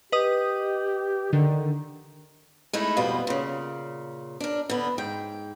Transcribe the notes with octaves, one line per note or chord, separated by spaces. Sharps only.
G4 B4 D#5 D#6
D3 D#3
G#3 A3 D#4 E4
F2 B2 G3 B3 F4 D#5
A#2 C#3
D4 A#4
D3 B3
G#2 G5